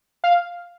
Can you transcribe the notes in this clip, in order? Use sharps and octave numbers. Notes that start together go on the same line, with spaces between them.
F5